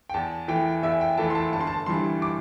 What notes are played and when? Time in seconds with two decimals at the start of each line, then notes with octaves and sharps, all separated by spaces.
0.09 G5
0.14 E2 A5
0.48 E3 A3 G5
0.83 E2 E5
1.01 G5
1.18 E3 A3 A5
1.30 C6
1.35 A5
1.52 G1 A5
1.61 C6
1.67 A5
1.86 G2 E3 G3 C6
2.22 D6